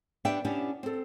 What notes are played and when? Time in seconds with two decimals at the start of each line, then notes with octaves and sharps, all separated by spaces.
0.25 B3 D4 G4 E5 G5
0.45 B3 C#4 D4 E4 G4
0.83 C4 A4